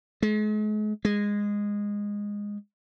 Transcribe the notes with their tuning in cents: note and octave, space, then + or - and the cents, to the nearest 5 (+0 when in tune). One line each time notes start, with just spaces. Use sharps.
G#3 +40
G#3 -15